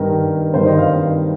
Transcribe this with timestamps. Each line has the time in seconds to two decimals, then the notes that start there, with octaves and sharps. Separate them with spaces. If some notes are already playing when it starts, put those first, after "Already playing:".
Already playing: G2 D#3 A#4
0.54 G2 D#3 C5
0.66 D#5
0.79 F5